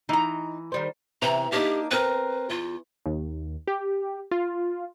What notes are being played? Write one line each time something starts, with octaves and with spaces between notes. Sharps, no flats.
E3 D#4 A#5
D#3 G3 C5
C3 E3 A#5
A#3 D4 D#4 G4
C4 A#4 B4
E2 F4
D#2
G4
F4